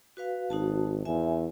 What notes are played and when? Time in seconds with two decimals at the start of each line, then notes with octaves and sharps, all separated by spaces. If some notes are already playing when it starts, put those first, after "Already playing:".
0.17 F#4 B4 F5
0.50 G#1 D#4 F#4 A5
1.05 E2 E5 G#5